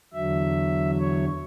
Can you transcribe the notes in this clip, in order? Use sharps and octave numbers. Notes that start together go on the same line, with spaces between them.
E2 D3 F#3 E5
C#5